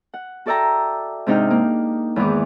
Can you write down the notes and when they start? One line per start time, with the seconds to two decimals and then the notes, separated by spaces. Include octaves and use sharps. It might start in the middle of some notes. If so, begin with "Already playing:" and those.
0.14 F#5
0.46 F#4 A4 D5 E5 G5 A#5
1.26 G#2 C3 D4 D#4 G5 F6
1.50 A#3
2.16 E2 G#2 D#3 E3 D6